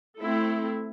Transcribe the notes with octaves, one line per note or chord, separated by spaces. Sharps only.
A3 C4 E4 A4